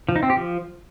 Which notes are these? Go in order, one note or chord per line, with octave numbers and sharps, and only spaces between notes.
F3
D#4
C4
G4
F3